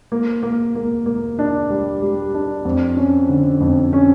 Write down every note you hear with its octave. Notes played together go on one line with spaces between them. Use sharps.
A#3
A#3
A#3
A#3
D4
G3
G3
D4
F2
C#4
D3
F2
C#4